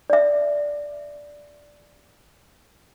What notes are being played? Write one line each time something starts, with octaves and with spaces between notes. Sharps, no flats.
D5 E5